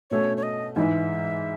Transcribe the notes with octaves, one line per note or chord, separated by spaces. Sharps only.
B2 A3 C#4 C#5
C#5
D#5
G#2 E3 G#3 D#4 E5